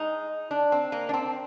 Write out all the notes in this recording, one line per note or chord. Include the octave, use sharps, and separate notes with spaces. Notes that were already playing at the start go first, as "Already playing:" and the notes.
Already playing: G#3 D#4
D4
C4
A#3
D4
C4